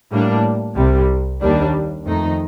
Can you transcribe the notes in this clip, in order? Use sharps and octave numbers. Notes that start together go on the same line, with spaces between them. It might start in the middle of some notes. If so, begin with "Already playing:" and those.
A2 G3 A#3 D4
C2 C3 G3
D#2 D#3 G3 A#3 D4
F2 D#3 A3 D#4